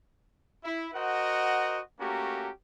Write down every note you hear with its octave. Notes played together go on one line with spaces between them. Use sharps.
E4
F#4 A#4 C5 D#5 F#5
A3 A#3 C#4 F#4 G4 A#5